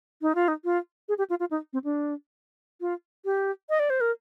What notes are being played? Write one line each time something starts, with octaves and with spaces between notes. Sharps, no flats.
D#4
F4
D#4
F4
G#4
G4
F4
F4
D#4
C4
D4
F4
G4
D#5
D5
C5
A#4